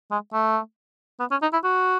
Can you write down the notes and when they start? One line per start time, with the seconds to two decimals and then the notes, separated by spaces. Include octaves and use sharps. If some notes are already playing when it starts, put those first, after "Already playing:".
0.11 G#3
0.33 A3
1.20 B3
1.31 C#4
1.42 D#4
1.53 E4
1.64 F#4